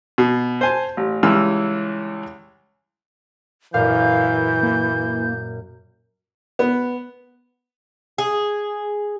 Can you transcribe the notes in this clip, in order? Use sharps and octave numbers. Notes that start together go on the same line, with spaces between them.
B2
C5 G#5 A5
A1
C#2 E3 G3 E6 F6
F#2 A#2 E3 F5 G6
A#3
B3
G#4